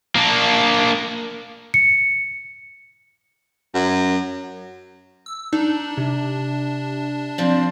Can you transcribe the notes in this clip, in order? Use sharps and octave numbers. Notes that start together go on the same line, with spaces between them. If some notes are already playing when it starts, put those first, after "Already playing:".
A#3 D4
C#7
F#2
E6
D4 D#4 D5
C3
F3 C4 D5